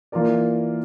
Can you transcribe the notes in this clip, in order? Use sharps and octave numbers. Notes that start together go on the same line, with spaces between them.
E3 A#3 F4 A#4 D5